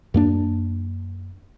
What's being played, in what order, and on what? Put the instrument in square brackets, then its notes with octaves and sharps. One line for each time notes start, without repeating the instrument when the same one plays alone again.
[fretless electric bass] F#2 A#3 D4